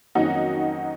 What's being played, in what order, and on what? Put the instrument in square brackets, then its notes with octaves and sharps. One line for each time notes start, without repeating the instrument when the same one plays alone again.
[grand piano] F2 D#3 F#3 A#3 C#4 [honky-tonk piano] D#4 F#4